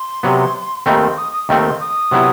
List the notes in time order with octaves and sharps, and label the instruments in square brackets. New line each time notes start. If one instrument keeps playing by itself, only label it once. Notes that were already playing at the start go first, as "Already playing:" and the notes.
Already playing: [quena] C6
[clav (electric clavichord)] C3 F#3 B3
[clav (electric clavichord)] D#2 D#3 A3 C4 [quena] B5
[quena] C6
D#6
D#6
[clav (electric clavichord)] D#2 D#3 A3 C4 [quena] C6
[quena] D#6
[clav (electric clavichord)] C3 F#3 B3 E4